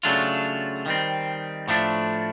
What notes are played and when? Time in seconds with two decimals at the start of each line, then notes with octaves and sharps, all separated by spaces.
0.03 C#3 F#3 A3 D4 F4
0.86 D#3 G3 C4
1.68 A2 F3 A3 D4